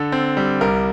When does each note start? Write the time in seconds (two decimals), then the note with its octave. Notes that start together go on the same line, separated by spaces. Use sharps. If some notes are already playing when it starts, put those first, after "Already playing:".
Already playing: D3 A4
0.12 C4
0.37 G3
0.61 C2 A#4